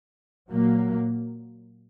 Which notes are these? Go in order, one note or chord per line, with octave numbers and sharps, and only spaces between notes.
A#2 F#3 A#3